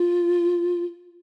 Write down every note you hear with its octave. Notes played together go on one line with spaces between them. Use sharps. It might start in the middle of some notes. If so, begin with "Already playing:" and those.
Already playing: F4